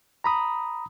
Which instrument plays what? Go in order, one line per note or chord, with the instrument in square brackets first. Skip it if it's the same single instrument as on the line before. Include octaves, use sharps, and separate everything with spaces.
[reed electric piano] A#5 B5 D#6